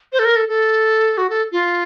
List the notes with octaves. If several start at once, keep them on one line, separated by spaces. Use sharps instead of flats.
C5
A4
A#4
A4
A4
F#4
A4
F4